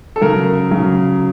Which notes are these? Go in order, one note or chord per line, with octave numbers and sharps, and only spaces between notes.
A4
C#3 F#3 A#4
C#3 F#3